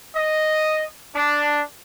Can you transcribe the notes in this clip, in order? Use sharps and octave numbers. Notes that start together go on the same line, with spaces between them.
D#5
D4